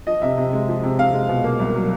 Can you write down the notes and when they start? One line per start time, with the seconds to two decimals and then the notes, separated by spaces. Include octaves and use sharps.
0.07 F3 D#5
0.22 C3 E5
0.38 C3
0.53 G#3
0.69 F3
0.83 C3
0.99 C3 F5
1.13 G#3
1.29 B2
1.44 A#3
1.59 C2
1.75 F#3